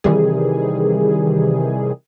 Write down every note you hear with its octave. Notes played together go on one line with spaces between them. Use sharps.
C3 D#3 E3 G3 G#4